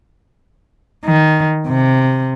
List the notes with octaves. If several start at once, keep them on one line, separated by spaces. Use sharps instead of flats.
D#3
C3